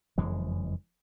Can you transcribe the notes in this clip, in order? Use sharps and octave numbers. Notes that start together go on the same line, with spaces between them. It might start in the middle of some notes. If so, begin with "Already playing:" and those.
F#1 F2 E3 G#3